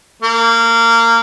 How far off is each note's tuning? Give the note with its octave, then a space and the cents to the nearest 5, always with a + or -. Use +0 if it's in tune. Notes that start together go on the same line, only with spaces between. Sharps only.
A#3 -20